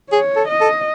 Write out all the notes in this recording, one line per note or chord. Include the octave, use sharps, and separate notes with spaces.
G#4 C#5
A4
D#5
A4